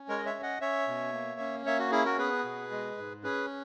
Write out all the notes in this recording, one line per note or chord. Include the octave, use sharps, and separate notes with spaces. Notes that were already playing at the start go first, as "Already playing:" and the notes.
Already playing: C#4
G#3 A#4 C#5
D#5
C#5 E5
C#4
D#5 F#5
C#4 C#5 E5
B2
A#3
C#4
A#3 C#5 E5
F#4
C#4 E4 G#4
F#4 A#4
B3 G#4 B4
B2
G#3
G#2
C#4 G#4 B4